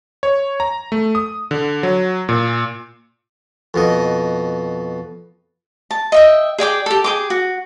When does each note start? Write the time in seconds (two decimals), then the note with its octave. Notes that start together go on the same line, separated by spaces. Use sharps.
0.23 C#5
0.60 A#5
0.92 A3
1.15 D#6
1.51 D3
1.83 F#3
2.29 A#2
3.74 F2 B2 D#5
5.91 A5
6.12 D#5 E5 G5
6.58 G#4 D5 G5 D6
6.86 G4 A4
7.04 G#4 G5 D6
7.30 F#4